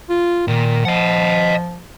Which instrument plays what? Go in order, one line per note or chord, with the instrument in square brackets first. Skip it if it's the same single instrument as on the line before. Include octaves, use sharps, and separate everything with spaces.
[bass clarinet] F4
[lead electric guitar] A#2 [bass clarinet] D#3
[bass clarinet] F3 [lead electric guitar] D#5 F#5